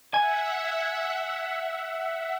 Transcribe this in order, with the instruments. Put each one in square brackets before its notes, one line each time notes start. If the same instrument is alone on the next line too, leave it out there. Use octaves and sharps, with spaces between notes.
[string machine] E5 F#5 [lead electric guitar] G#5